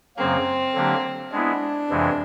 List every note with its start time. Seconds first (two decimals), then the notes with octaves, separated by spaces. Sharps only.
0.17 F#2 C#3 F#3 A#3 C4
0.74 D3 F#3 A#3 D4 G4
1.32 G#3 B3 D4 E4
1.89 F2 C3 E3 G#3